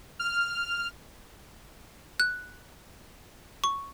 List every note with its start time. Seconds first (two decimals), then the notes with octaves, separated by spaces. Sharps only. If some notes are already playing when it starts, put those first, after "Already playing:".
0.19 F6
2.20 F#6
3.64 C#6